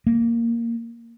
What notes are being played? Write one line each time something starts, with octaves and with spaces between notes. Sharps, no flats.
A#3